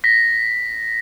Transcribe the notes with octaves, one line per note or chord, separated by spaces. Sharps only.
A#6 B6